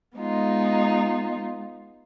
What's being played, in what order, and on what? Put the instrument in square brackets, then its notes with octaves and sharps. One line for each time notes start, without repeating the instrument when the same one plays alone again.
[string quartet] G#3 B3 D#4 F4